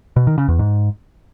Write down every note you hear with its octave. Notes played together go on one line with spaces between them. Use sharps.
B2
D#3
C#3
E2
G#2